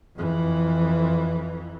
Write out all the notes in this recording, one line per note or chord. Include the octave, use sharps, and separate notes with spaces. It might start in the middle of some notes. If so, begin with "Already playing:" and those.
F2 E3